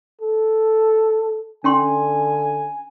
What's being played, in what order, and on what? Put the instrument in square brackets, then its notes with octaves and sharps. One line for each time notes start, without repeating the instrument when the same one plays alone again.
[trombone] A4
[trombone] D3 [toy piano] C#4 G5 C6 [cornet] G#5